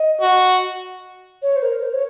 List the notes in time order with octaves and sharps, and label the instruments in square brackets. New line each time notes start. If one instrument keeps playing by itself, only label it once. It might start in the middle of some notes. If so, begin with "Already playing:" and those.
Already playing: [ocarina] D#5
[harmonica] F#4
[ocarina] C#5
C5
A#4
C5
C#5